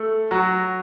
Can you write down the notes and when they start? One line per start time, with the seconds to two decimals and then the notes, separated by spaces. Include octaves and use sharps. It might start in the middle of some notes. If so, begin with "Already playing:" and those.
Already playing: A3 A4
0.31 F#3 F#4